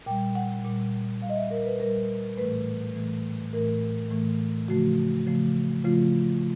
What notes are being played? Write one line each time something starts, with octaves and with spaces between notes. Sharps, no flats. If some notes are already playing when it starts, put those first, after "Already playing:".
A#2 G3 G5
F#5
A#2 G3
A#2 G3 F5
D#5
E5
A#4
B4
A#2 G3 A#4
A2 E3 A3 B4
A2 E3 A3
A2 E3 A3 A#4
A2 E3 A3
C#3 F3 A3 F#4
C#3 F3 A3
C#3 F3 A3 F4